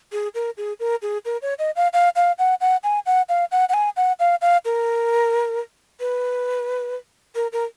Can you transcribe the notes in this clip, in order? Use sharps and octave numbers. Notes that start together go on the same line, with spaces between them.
G#4
A#4
G#4
A#4
G#4
A#4
C#5
D#5
F5
F5
F5
F#5
F#5
G#5
F#5
F5
F#5
F#5
G#5
F#5
F5
F5
A#4
B4
A#4
A#4